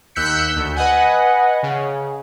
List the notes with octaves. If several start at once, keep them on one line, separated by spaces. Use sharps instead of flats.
D#2 E6 F#6 G6 B6 C#7
D2
B4 D#5 F#5 G#5
C#3